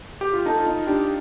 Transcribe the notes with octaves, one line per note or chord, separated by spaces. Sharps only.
G4
F4
D#4 A4
F4
D#4
D4 G4